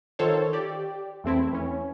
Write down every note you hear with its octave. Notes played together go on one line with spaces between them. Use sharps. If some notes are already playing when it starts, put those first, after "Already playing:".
D#3 F4 A4 C5 C#5
G4 D5
E2 A3 C4 E4
E3 C#4